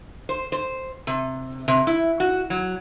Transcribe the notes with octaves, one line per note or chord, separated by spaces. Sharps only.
C5
C5
C3
C3
E4
F#4
F#3